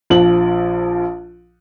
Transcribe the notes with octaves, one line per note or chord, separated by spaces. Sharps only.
A#1 F3 F#7